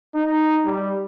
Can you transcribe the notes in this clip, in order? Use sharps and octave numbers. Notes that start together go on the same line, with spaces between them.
D#4
G3